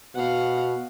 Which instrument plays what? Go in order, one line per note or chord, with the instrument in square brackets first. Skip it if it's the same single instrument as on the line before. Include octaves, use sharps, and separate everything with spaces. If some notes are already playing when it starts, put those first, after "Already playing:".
[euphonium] B2 [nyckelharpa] F5 F#5